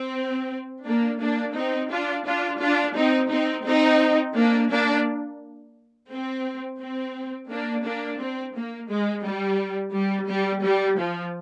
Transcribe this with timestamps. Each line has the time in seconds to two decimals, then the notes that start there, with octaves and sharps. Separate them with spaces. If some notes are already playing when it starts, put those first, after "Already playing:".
Already playing: C4
0.86 A#3 D4
1.22 A#3 D4
1.56 C4 D#4
1.91 D4 F4
2.26 D4 F4
2.61 D4 F4
2.96 C4 D#4
3.31 C4 D#4
3.66 C4 D#4
4.36 A#3 D4
4.71 A#3 D4
6.10 C4
6.80 C4
7.50 A#3 D4
7.85 A#3 D4
8.20 C4
8.55 A#3
8.90 G#3
9.25 G3
9.95 G3
10.29 G3
10.65 G3
10.99 F3